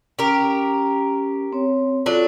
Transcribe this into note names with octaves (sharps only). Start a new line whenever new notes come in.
C#4 G4 A#4 G5
C4 C#5
F#3 D4 F4 A4 C#5